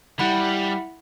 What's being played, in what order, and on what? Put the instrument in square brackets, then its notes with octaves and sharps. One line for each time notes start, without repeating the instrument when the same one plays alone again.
[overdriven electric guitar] G3 [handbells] E4 F#5 B5